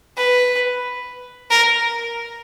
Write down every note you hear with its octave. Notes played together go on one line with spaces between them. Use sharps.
B4
A#4